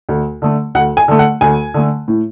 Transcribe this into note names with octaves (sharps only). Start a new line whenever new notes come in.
D2
D3 A3
D2 F#5
G#5
D3 A3
F#5
D2 G#5
D3 A3
A2